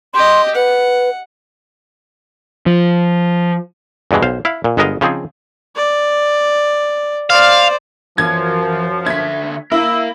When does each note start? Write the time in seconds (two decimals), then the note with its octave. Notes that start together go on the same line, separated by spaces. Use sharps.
0.14 G4 D#5 C6
0.55 B4 F#5
2.66 F3
4.11 E2 G2 B2 E3 G#3
4.22 B1 C5 F5
4.45 E4 F5
4.64 A#2
4.77 G1 G#3 B3 A#4 D#5 F5
5.01 C#3 F3 C4 D#4 G#4
5.76 D5
7.30 C5 D5 F5
8.18 F#2 E3 F3 G#6
9.06 D3 E5 G#6 B6
9.72 E4 A#4 F5 E6